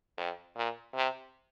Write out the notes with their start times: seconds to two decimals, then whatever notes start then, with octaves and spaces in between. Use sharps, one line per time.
0.18 F2
0.56 A#2
0.95 C3